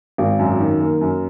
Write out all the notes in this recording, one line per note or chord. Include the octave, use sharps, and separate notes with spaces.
G#1
F#2
D#3
A#3
F#2